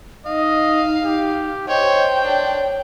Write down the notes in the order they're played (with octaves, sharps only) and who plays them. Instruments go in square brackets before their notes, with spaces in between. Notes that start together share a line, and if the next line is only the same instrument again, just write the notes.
[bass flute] D#4 [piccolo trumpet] D#5 [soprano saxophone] F5
[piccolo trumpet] G4
[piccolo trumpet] C5 [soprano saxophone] C#5 [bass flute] D#5 [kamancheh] G5
[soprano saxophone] D4 [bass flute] C#5